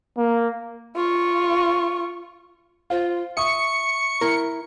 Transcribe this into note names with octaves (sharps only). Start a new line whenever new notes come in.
A#3
F4 C#6
F4 C5 F5
E5 C#6 D#6 C#7
E4 A#4